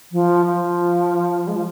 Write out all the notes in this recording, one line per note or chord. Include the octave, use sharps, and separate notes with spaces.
F3
F3
G#3
F3